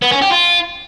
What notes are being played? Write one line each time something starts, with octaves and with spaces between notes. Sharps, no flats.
B3
C#4
G4
F4